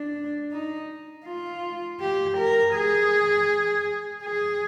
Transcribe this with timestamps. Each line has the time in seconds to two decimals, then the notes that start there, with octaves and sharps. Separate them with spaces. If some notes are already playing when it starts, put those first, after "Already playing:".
Already playing: D4
0.52 D#4
1.26 F4
2.00 G4
2.37 A#4
2.75 G#4
4.24 G#4